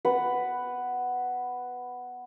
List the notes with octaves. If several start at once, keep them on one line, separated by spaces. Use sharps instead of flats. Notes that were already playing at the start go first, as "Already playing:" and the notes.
B3 B4 F#5